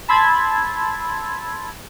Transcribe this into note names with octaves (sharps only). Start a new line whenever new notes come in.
A5 B5 C6 E6 G#6 A6